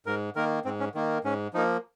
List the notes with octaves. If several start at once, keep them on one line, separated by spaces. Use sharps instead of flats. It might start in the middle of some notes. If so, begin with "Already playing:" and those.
G#2 A#4
D#3 A#3 A#4
G#2 C4
C#4
D#3 A#3
G#2 C#4
F3 A#3 D#4